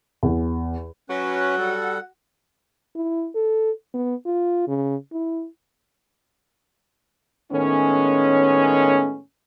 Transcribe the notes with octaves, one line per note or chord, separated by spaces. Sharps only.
E2
F#3 C#4 F#4 B4 F#5
G3 A4
E4
A4
B3
F4
C#3
E4
A2 D#3 G#3 A3 B3 C#4